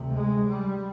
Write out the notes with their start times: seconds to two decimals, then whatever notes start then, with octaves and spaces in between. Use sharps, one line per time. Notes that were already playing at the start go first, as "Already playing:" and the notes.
Already playing: D2 C3
0.14 G#3
0.47 G3